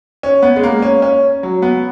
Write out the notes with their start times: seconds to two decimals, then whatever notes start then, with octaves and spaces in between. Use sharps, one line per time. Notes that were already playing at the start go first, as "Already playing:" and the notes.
0.23 C#4
0.42 B3
0.56 G#3
0.63 A#3
0.82 C#4
1.02 C#4
1.43 F#3
1.62 B3